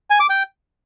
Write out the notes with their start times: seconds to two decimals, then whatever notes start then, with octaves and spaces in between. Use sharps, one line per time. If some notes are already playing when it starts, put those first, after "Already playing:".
0.10 G#5
0.20 D6
0.30 G5